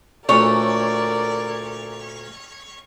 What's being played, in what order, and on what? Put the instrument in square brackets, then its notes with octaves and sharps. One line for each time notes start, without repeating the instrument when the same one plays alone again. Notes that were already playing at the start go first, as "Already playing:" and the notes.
[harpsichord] D2 A#2 A3 [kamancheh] A#4 D5 [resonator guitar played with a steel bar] C#5